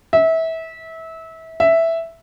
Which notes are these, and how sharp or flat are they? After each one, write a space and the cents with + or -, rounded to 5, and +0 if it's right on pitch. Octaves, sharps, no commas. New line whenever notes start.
E5 -25
E5 +0